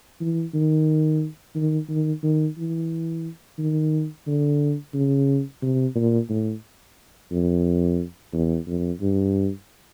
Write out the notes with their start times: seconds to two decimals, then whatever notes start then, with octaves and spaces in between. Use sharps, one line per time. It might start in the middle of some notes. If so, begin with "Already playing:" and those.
0.21 E3
0.54 D#3
1.55 D#3
1.89 D#3
2.23 D#3
2.58 E3
3.59 D#3
4.27 D3
4.94 C#3
5.63 C3
5.95 A#2
6.30 A2
7.31 F2
8.33 E2
8.68 F2
9.01 G2